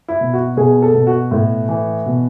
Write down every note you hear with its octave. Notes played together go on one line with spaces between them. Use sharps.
E4
B2
F#4
B2 G#4
A4
B2
F#4
A2
E3
B2